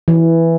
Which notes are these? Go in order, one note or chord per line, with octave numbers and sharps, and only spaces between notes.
E3